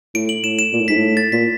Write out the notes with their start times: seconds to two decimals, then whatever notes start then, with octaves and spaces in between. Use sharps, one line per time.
0.15 A2 D7
0.29 F#7
0.43 A2 E7
0.59 E7
0.73 A#2
0.80 A2
0.88 G#2 B6
0.96 A2
1.17 A6
1.32 A#2 B6